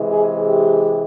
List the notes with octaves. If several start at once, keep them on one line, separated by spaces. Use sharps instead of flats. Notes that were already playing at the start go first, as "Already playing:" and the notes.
Already playing: C3 E3 G#3
G#4
G4